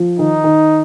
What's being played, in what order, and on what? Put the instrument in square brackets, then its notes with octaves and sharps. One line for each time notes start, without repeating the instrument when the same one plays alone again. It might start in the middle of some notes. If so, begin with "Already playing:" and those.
Already playing: [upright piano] F3
[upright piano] D#3 [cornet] D#4
[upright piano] D#3